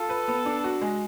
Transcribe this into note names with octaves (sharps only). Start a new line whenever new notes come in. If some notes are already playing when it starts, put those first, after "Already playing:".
Already playing: F4 A4
B4
B3
D4
F#4
G#3